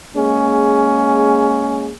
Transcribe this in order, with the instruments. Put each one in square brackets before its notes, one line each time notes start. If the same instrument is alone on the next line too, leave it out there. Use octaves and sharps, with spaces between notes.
[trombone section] G#3 A#3 C#4 G#4